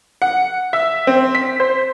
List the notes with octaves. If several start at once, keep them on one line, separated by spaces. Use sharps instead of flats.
F#5
E5
C4
B6
C5